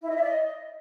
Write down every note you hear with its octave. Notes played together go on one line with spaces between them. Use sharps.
E4
D#5
E5
D5
D#5